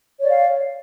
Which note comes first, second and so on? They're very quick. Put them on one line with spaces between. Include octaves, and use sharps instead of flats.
C#5 D5 F5